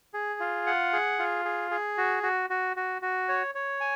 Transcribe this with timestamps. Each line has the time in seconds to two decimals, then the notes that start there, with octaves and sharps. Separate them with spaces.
0.14 G#4
0.40 F4
0.67 F#5
0.93 G#4
1.19 F4
1.45 G#4
1.71 G#4
1.98 F#4
2.23 F#4
2.50 F#4
2.77 F#4
3.02 F#4
3.29 C#5
3.55 C#5
3.81 G#5